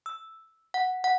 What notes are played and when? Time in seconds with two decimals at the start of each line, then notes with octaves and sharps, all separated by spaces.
0.06 E6
0.74 F#5
1.04 F#5